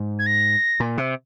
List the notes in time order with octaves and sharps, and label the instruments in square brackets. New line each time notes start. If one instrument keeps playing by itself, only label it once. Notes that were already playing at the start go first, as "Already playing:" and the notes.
Already playing: [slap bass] G#2
[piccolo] G#6
A#6
[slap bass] A#2
C3